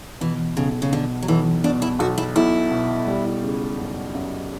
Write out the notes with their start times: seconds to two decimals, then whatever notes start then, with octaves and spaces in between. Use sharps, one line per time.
0.21 B2 E3
0.57 B1 C#3
0.82 C#3
0.92 B2 D3
1.23 F#3
1.28 B1 E3
1.64 B2 D4
1.82 E4
1.99 B1 F#4
2.18 E4
2.36 B1 E4
2.71 B2
3.07 G3
3.43 C#3
3.78 F#2
4.15 F#2